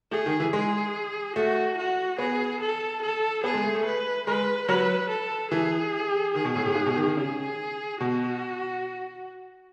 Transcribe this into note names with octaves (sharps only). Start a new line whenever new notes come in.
A3 G#4
D#3
E3
G#3 G#4
A3 F#4
F#4
B3 G#4
A4
A4
B3 G#4
G#3
A3
A3
B4
G#3 B4
F#3 B4
A4
E3 G#4
D#3 G#4
B2
A2
A2
G#2
B2
D#3
D#3
C#3 G#4
B2 F#4